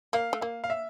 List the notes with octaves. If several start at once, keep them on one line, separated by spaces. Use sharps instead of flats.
A#3 F5
A3
A#3 F5
F5
E5